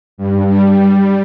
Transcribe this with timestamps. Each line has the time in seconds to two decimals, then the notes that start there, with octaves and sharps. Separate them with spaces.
0.18 G2
0.46 G3